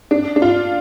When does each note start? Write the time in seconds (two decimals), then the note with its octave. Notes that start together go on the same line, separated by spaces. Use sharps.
0.11 D4
0.36 D4
0.42 F4